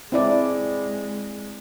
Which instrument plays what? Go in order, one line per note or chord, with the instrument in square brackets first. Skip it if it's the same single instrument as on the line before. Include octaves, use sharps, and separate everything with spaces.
[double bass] G#3 [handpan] C4 E4 D5